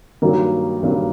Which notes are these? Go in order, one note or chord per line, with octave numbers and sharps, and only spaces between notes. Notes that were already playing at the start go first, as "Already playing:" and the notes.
G2 D#3 F#3 A#3
G2 D#3 F#3 A#3